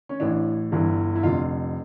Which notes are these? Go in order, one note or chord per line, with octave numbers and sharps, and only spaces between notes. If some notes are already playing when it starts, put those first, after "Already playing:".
C#4
A1 A2 E3 D4
G1 G2 E3
E4
F1 F2 D3 F4